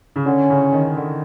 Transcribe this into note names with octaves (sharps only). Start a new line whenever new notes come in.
C#3
D3 C#4
C#3
D#3
D3